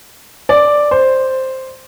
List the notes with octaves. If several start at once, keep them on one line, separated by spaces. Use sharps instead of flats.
D5
C5